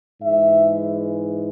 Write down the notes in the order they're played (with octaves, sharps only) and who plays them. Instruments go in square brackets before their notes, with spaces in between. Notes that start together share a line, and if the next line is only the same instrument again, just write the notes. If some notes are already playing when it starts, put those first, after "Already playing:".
[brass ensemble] G#2 E3 G#3 E5